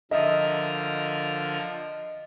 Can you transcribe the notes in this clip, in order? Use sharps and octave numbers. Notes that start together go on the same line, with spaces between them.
D3 F3 A#4 D#5 E5